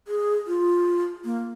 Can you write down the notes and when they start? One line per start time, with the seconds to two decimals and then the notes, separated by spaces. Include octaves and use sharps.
0.08 G#4
0.47 F4
1.25 A#3